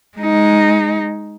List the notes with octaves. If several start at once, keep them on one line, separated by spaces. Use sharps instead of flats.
G#3 D#4